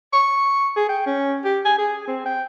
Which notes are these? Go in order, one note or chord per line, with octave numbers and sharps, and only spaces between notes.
C#6
G#4
G5
C#4
G4
G#5
G#4
C4
G5